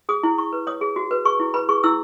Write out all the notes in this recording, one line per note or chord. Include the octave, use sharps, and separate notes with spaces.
G#4 D#6
E4
E4 C#6
B4
C#5 D#6
G#4
F#4
B4
G#4 C#6
E4
B4 B5
G#4 C#6
E4 E6